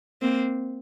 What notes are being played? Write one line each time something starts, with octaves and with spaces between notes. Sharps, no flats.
A#3 C4